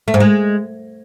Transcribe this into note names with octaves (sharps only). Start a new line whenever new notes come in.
A3
G#2
G#3